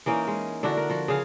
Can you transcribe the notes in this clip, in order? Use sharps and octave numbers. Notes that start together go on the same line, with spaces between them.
E3 A#3 C#4 D#4
G#3
D3 D4 E4 F#4
A#4
F3 F#4
C#3 G#4 F5